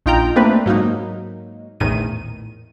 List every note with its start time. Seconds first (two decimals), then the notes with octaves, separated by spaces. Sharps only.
0.06 A#1 D#4 F4 G5 A#5 G6
0.36 A3 A#3 C4 D4 B4
0.66 G#2 F#3 A#3 D#4
1.80 A#1 E2 A2 D#3 D#7